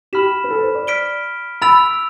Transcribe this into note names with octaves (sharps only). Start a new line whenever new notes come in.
G4 B5 F6 B6 E7
B4
A4
C5
D5
F6 B6 D7 G7
B5 E6 A6 D7 F7